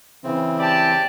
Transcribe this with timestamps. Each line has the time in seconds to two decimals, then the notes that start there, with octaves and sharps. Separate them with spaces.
0.24 C#3 E3 C4
0.58 G4 D5 A5